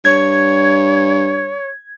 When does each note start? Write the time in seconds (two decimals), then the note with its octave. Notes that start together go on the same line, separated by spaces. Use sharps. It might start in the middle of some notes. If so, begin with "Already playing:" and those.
0.05 G2 C#5 G#6